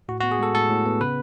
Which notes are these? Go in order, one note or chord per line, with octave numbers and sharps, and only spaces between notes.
A2 F#4
B3 F#4
G#4
G#3 A4
A2 A4
A2
B3
C#3 B4